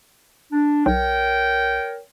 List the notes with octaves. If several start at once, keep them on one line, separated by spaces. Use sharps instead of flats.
D4
B1 A#4 C#5 G5